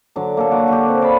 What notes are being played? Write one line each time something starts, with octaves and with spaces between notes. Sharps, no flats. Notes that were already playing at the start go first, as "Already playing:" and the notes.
D3 F#3 D6
A#3 A4
F#4 D6
F#4 G4
C4
D5 F5 A5 B5